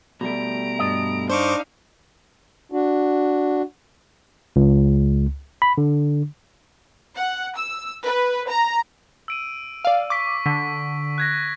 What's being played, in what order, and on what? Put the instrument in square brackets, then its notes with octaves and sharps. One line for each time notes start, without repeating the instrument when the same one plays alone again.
[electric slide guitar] B2 G3 A3 [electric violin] A#5 D7
[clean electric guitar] G2 A4 D#5
[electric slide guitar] D4 [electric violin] D#4 F5 [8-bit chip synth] C5 C#6 D6
[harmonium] D4 F#4
[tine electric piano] C#2
B5
D3
[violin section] F#5
E6
B4
A#5
[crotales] E6 D7 D#7
[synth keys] D5 F5
[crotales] C#6 B6 [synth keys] D6
[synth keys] D3 [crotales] B6
[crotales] F#6 G#6 A#6